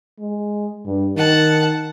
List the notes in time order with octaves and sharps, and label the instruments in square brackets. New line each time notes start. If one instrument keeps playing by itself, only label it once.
[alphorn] G#3
G2
[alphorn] D#3 [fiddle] F#5 A5